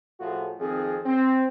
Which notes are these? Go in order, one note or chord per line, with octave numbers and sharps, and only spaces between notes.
A2 F3 A3 F4 F#4 G#4
F2 D#3 C4 G#4
C4